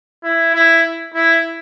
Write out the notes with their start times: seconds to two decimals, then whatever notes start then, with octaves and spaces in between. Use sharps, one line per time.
0.24 E4
0.54 E4
1.14 E4